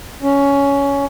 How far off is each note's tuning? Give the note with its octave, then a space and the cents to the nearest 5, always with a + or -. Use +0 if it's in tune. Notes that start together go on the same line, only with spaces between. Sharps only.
C#4 +15